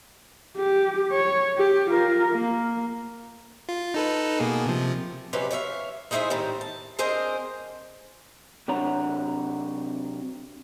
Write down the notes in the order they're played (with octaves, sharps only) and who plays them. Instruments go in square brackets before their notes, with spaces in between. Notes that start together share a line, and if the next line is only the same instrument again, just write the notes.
[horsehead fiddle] G4
C#5
G4
F4 A#4
A#3
[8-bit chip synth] F4
D#4 A4 B4
B2 A#3 G#4
C3 F3
[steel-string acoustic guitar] C3 F#3 G#3 C#4 G4 B4
C#5 D5 E5 F5
G#3 D#4 E4 G#4 C5 E5
A2 D#3 G3 C4
A5
C4 D4 G#4 A#4 C5 D#5
[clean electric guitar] C3 F#3 D4 C#5 F#5 A#5